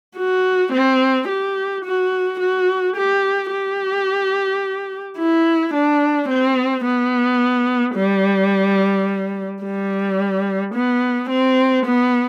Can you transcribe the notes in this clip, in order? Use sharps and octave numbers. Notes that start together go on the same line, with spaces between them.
F#4
C4
G4
F#4
F#4
G4
G4
E4
D4
C4
B3
G3
G3
B3
C4
B3